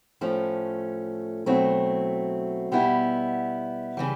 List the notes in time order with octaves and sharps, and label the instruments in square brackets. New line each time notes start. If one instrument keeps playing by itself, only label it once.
[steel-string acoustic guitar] A2 F3 A3 C#4
B2 F#3 A3 C4 E4
B2 G3 B3 E4
C#3 E3 G3